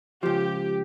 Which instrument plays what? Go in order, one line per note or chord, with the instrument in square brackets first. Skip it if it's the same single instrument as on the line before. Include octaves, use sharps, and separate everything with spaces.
[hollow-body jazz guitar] C#2 F3 [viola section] G4